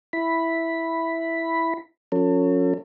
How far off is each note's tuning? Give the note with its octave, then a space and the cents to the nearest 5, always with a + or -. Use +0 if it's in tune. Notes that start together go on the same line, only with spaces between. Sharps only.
E4 +0 B5 +0
F3 +40 C#4 +0 A4 +40